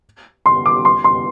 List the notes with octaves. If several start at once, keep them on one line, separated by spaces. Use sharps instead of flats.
C6
D6
C6
C6